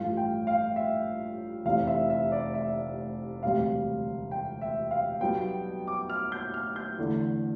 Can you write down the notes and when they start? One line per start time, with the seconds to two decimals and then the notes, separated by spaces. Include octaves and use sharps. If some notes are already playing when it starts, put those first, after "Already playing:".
Already playing: A1 G2 F3 A3 F5
0.17 G5
0.47 F5
0.76 E5
1.65 F1 E2 C3 F5
1.87 E5
2.10 E5
2.32 D5
2.54 E5
3.43 E1 D2 C3 G3 F5
4.31 G5
4.61 E5
4.91 F5
5.20 B1 B2 G3 B3 G5
5.87 D6
6.10 F6
6.32 G6
6.54 F6
6.76 G6
6.98 E2 D3 A3